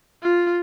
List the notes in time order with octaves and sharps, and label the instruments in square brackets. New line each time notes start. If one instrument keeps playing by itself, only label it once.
[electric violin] F4